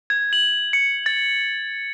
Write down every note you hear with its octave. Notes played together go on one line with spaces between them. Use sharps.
G#6
F#7
C#7
A6